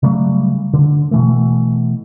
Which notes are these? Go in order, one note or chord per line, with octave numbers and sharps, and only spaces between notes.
C#3 F#3 G3 A3
D3
B2 E3 A3